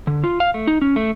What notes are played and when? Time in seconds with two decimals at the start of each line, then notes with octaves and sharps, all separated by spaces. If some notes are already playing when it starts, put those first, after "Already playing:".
0.07 D3
0.24 F4
0.40 F5
0.54 A3
0.67 D#4
0.81 C#4
0.96 A3